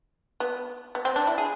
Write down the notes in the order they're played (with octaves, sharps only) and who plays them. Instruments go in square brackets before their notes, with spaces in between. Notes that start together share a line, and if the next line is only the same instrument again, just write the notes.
[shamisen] B3
B3
C4
D4
E4
G#4